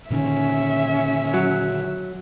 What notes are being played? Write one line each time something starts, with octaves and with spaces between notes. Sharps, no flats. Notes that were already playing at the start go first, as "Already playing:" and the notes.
A#2 D3 D#3 C#4 E5
F#3